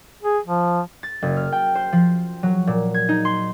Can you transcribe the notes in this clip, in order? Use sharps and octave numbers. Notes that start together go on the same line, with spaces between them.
G#4
F3
A6
F#1
F6
G5
C5
F3
F#3
A#2
G#6
D#4
C6